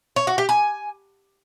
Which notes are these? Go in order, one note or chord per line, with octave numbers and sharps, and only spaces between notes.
C#5
F#4
G4
G#5